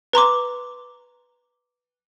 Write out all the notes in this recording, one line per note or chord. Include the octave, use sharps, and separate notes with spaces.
B4 A#5 C6 D6